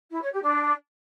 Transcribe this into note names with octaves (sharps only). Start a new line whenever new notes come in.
E4
C#5
G4
D4